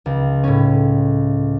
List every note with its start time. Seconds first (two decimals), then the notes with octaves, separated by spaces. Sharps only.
0.06 C#2
0.44 A2 C#4